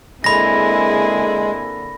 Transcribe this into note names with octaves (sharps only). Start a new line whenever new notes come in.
D3 G#3 A#3 C4 E4 G#4 B5 A#6